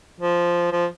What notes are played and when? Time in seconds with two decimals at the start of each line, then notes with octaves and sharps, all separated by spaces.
0.21 F3
0.72 F3